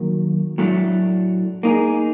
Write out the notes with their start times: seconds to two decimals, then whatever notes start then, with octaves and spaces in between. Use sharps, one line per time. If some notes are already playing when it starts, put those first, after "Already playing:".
Already playing: D#3 F#3 A#3
0.58 A2 F#3 A3 D4
1.63 A#3 D#4 G#4